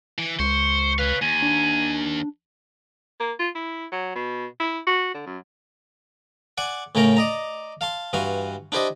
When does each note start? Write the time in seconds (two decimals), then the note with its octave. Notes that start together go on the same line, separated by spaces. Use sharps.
0.18 E3
0.39 C#2 C5 C#6
0.99 B4 C#5 F5
1.22 D#2 G#5
1.42 D4
3.20 A#3
3.39 F4
3.55 E4
3.92 F#3
4.15 B2
4.60 E4
4.87 F#4
5.14 D3
5.26 F#2
6.58 D5 F#5 G#5
6.95 A2 C#3 C#4 A#4 G5 A#5
7.17 D5 D#5 A#5
7.81 F5 A5 C6
8.13 G2 E3 F#4 F5 C6
8.72 D4 E4 G4 C5 D5 D#5